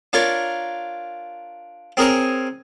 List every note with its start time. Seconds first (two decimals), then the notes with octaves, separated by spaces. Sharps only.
0.13 D4 F4 A#4 C#5
1.97 C4 G#4 A#4 C#5 C#6 D#6